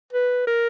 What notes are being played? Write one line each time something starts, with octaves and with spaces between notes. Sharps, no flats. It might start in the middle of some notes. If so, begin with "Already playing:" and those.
B4
A#4